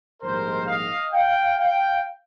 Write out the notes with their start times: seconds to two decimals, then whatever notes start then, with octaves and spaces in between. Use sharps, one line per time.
0.21 A#1 G#2 D#3 G3 A#4 C5
0.67 D#5 F5
1.11 F5 G5
1.57 F5 G5